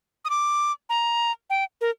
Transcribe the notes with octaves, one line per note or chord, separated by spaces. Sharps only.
D#6
D6
A#5
G5
A#4